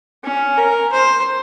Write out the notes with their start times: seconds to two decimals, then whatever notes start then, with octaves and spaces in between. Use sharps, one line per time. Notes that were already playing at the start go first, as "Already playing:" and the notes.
0.24 C#4
0.57 A#4
0.91 C5